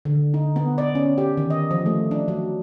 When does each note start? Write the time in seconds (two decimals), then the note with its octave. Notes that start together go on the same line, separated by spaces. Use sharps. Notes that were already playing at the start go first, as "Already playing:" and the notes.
0.05 D3
0.34 D#4
0.56 B3
0.78 D5
0.95 C#4
1.18 G4
1.37 D#3
1.50 D#5
1.71 F3
1.86 A3
2.11 D4
2.28 F#3